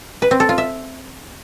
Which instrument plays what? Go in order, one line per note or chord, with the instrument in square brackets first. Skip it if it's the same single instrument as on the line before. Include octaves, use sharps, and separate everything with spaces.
[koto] B4
C4
A4
F4
E5